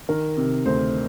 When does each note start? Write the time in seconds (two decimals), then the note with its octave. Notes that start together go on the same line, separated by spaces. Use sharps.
0.09 D#3 A#4
0.37 C3
0.66 D2 C5